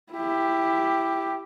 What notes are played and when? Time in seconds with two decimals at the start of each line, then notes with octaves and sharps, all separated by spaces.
0.13 E4 G4